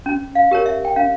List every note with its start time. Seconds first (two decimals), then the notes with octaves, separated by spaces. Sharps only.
0.06 C#4
0.35 F5
0.51 G4 A#4 C#5
0.66 E5
0.85 G5
0.96 C#4 F5